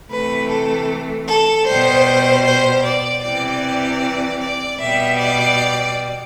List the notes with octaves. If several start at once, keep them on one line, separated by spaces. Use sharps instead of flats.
C3 E3 A3 B4
A4
A4
B2 G3 C5
C5
D5
C3 E3 G3 D5
D5
B2 G3 E5
D5